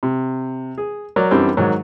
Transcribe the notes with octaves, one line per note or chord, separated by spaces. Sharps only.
C3
G#4
F#3 A#4 D5
F#2 E3 G3 C4 D4
G#2 D#3 F#3